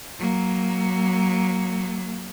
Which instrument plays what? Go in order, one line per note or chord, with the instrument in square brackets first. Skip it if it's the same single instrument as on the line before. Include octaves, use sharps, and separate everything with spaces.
[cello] F#3 A#3